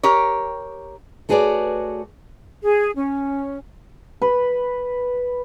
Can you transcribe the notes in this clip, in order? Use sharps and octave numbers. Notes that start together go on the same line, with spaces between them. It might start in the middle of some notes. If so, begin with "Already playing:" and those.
G4 A#4 C#5
A3 F#4 G#4 B4 C#5 D5
G#4
C#4
B4